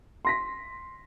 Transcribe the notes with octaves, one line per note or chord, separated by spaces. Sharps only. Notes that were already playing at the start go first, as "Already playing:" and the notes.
C6 A#6 B6